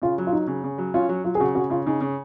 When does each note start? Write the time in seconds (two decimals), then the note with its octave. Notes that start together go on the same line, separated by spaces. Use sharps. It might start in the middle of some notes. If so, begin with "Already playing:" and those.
0.02 C#3 F4
0.18 F#3
0.27 F4
0.32 F#3 D#4
0.48 C#3
0.64 C#3
0.78 F#3
0.94 C#4 F4
1.09 F#3
1.24 F#3 F4
1.35 G#4
1.40 C#3 F#4
1.55 C#3 F#4
1.70 C#3 F4
1.86 C#3 D#4
2.01 C#3